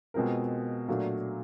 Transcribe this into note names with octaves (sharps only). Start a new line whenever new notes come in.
B2 G#3 C4 F4 A#4
A#2 F#3 A3 D4